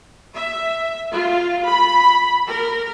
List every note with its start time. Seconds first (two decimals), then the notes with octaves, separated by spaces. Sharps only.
0.32 E5
1.12 F4
1.67 B5
2.47 A#4